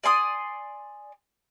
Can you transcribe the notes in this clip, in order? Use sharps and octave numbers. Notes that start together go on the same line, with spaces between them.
D5 G#5 C6 D#6